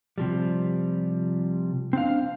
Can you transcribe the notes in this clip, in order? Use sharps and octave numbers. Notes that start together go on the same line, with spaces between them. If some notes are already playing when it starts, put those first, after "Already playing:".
C3 F3 G3
C4 D4 F5